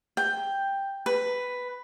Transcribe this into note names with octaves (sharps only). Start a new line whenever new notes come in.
G5
B4